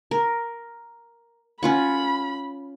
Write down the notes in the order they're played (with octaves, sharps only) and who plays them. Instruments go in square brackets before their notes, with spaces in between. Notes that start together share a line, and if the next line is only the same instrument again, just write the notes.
[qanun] A#4
[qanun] C#4 F4 F#5 [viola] B5